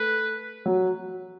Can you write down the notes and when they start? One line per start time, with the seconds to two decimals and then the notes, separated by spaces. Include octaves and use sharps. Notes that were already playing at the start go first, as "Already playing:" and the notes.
Already playing: A3 B4
0.66 F#3